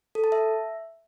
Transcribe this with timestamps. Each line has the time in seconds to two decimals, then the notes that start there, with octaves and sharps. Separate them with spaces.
0.15 A4
0.24 A5
0.32 E5